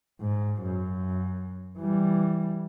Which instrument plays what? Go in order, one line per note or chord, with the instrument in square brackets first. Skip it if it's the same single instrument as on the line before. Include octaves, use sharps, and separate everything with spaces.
[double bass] G#2
F#2
E3 G3